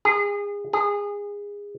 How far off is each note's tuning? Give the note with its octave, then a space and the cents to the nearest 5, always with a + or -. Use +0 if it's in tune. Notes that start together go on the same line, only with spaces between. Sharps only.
G#4 -30
G#4 -25